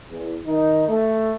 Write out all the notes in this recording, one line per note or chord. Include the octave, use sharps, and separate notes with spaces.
E2
D#3 D#4
A3